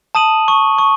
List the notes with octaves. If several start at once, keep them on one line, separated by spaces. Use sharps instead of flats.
A5 D#6 D#7 F#7
C#6
C#6